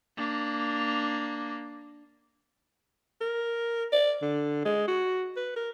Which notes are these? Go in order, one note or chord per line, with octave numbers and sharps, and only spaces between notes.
A#3 D4
A#4
D5
D3
G#3
F#4
B4
A#4